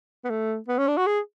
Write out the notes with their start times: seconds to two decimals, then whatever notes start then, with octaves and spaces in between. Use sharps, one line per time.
0.24 B3
0.30 A3
0.68 B3
0.78 C#4
0.87 D4
0.97 F#4
1.06 G#4